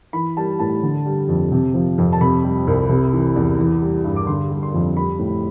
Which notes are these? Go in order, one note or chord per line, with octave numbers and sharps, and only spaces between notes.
E3 B5
G3 A5
A2 A5
D3
G3
F2
C3
F3
F2
A5
C3 B5
G3
C2
C3
E3
E2
E3
G3
G2
D6
D3 C6
G3
C6
F2
G3 B5
A2